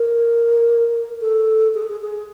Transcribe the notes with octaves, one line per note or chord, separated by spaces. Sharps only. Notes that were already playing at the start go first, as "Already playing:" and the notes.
Already playing: A#4
A4
G#4
A4
G#4
G#4